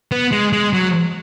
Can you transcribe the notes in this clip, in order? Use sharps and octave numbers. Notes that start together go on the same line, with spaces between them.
B3
G#3
G#3
F#3